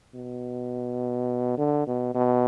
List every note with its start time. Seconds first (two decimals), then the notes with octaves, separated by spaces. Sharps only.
0.15 B2
1.58 D3
1.87 B2
2.15 B2